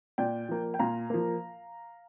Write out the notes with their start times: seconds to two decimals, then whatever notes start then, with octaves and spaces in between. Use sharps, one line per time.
0.18 A#2 D5 G5
0.49 F3 A#3
0.74 G5
0.79 A#2 F5 A#5
1.10 F3 A#3